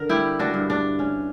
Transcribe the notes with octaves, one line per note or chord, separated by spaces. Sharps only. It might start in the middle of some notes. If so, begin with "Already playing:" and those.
Already playing: D3 A#4
G3 E4 G4
D4 F#4
G2
D4
C#4